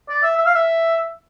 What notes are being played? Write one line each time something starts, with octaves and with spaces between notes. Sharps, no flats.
D5
E5
E5
F5
E5